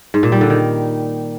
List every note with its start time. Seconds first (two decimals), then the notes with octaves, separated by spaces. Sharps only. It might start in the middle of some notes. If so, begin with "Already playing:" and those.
0.14 G#2
0.23 A#2
0.32 G3
0.41 D3
0.50 D#3